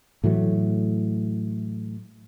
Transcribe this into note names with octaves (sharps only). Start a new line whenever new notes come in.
A2 E3 F#3 A3